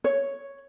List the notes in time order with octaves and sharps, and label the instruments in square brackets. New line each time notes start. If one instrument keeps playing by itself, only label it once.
[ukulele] C#5